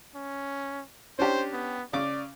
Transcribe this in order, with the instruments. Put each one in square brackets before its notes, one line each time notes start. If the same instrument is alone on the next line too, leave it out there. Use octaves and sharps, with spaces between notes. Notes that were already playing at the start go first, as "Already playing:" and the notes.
[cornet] C#4
[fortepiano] C#4 D4 G4 [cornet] C5
[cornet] B3
[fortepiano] C#3 D6 [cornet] D5